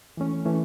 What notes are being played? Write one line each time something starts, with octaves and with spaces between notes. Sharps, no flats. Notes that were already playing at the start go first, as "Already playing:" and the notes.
E3 A3 C#4
E3 A3 C#4